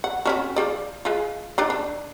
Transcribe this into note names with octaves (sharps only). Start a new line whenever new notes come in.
F#5
C4 C#4 F#4
F3 G#4 D5
G#3 F4
D4 D#4 D5
D4